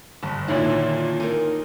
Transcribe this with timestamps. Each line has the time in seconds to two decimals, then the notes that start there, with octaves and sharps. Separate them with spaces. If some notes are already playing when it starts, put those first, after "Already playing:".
0.23 G1 A5
0.48 A#2 D3 D#3 D4 E4 C#5
1.20 D#4 A#4